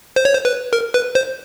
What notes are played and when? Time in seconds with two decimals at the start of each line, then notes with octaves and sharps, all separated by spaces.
0.16 C5
0.25 C#5
0.33 C5
0.45 B4
0.73 A#4
0.94 B4
1.15 C5